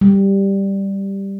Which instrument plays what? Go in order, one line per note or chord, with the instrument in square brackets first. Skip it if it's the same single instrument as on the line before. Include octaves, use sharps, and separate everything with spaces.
[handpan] G3